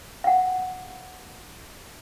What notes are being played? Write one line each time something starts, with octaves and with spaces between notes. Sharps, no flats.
F5 F#5